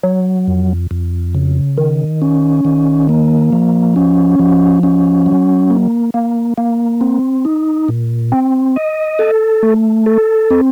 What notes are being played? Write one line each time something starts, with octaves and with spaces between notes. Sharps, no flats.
F#3
F2
F2
C#3
D#3
C#4
D#3
A#3
F3
C#4
F3
C#4
F#3
A#3
A#3
A#3
C4
D#4
A#2
C4
D#5
A4
A3
A4
C4